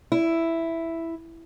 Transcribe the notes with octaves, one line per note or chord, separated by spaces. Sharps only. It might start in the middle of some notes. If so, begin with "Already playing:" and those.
E4